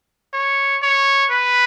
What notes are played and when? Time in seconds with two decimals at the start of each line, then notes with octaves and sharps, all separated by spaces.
0.34 C#5
0.82 C#5
1.31 B4